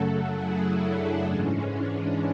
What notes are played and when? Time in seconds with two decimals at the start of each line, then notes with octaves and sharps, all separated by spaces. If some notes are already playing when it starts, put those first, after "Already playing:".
Already playing: F#2 C#3 F#3 A3 F#4 A4
0.31 E4 G#4
0.77 D4
1.24 G#2 E3 G#3 C#4
1.71 D4